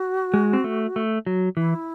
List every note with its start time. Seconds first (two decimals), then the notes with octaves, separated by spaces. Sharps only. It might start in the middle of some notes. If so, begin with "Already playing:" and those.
Already playing: F#4
0.34 G#3
0.53 C4
0.64 A3
0.96 A3
1.26 F#3
1.57 E3 E4